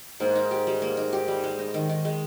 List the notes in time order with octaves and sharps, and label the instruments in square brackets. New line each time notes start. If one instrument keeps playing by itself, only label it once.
[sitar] G#2 [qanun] A#3
[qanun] D#4
G4
G3
A#3
D#4
G4
G3
G#3
D#4
D#3
D#3
G#3